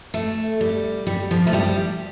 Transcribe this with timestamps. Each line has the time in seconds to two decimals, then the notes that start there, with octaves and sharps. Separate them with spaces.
0.14 A3
0.61 G3
1.07 G3
1.31 F3
1.47 A3
1.53 G3